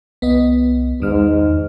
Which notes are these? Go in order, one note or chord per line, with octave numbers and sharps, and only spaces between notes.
C2 B3 D#5
E2 G#2 D#3 F6